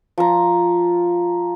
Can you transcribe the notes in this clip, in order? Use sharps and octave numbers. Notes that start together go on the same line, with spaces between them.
F3 A#5